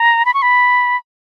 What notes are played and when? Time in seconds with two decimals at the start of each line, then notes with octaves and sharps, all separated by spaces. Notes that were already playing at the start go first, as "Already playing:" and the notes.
Already playing: A#5
0.25 B5
0.34 C#6
0.42 B5